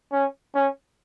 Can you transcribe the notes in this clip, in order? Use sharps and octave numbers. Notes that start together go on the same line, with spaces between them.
C#4
C#4